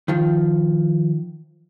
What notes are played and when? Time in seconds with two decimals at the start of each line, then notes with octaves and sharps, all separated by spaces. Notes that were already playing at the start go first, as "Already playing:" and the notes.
0.08 D#3 F3